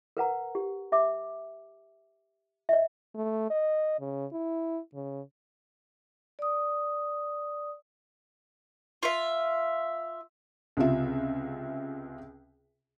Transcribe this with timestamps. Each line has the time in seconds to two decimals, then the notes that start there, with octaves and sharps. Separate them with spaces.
0.17 A#4 B4 F#5 A#5
0.55 G4
0.92 G4 E5 D6
2.69 D#5 E5
3.15 A3
3.50 D#5
4.00 C#3
4.32 E4
4.94 C#3
6.39 D5 D#6
9.03 F4 E5
10.77 C#2 C3 F4 E5